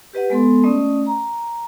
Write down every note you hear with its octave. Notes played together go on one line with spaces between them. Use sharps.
G4 B4 D#5 F#5
G#3 B3 A4 C6
A3 C#4 D5 D#5 D#6
A#5